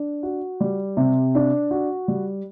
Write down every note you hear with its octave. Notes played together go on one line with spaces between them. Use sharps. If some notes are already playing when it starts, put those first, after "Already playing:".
Already playing: D4
F#4
G3
C3
D4
F#4
G3